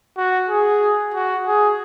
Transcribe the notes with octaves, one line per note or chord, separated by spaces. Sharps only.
F#4
G#4
F#4
G#4